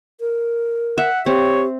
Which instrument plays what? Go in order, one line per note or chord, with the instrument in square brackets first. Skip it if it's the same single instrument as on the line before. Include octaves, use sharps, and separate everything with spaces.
[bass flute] A#4
[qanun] E5 [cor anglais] F#5
[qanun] C4 [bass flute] G4 [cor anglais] C#5